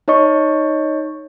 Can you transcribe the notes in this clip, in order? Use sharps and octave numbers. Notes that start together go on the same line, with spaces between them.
D#4 C#5 D#5 C#6